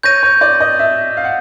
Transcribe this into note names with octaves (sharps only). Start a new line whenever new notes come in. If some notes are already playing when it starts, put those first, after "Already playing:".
C#5 G6 A#6 D#7
C#5
D5
D#5
E5
F5
F#5